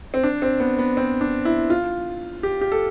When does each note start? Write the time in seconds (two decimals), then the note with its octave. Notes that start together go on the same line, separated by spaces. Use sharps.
0.14 C4
0.23 D4
0.42 C4
0.60 B3
0.79 B3
0.97 C4
1.21 D4
1.45 E4
1.70 F4
2.43 G4
2.61 G4
2.72 A4